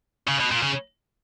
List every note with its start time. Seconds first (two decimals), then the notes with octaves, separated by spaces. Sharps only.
0.28 C#3
0.40 B2
0.51 A#2
0.63 C#3